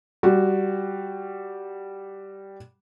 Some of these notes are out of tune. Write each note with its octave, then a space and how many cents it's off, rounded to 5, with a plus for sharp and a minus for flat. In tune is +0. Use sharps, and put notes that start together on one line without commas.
G3 -5 F#4 +5